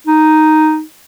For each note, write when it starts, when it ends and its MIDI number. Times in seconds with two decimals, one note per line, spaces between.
0.07 0.82 63